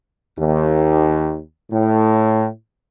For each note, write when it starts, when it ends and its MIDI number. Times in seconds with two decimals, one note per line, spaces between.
0.37 1.37 39
1.70 2.46 45